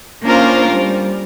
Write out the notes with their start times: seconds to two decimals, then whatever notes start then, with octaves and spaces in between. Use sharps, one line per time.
0.22 A#3 C#4 D4 F4 A#4 C5
0.71 G3